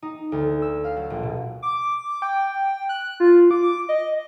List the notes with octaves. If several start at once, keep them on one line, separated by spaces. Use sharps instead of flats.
D#4
D2
E6
F5
F#3
A#1
B2
D6
G5
F#6
F4
D6
D#5